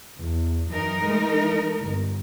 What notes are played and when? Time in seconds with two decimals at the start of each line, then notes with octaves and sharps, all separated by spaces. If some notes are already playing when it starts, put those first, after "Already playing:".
0.21 E2
0.69 F#2 E3 D#4 A#4
1.04 G#3 A3
1.80 G1